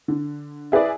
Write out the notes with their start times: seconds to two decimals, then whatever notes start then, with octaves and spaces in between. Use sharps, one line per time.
0.08 D3
0.72 E4 G#4 B4 D5